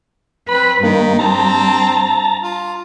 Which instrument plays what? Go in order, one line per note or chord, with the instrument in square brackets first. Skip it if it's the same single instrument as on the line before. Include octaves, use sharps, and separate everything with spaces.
[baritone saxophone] C4 [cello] B4 [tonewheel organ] B5
[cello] G2 [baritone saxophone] D#3 [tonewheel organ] A#3
[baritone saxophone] C4 [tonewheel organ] A5 A#5
[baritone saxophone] F4